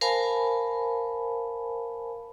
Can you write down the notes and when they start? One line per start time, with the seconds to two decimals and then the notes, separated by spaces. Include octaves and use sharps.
0.01 A#4 C5 F5 G#5 A5 B5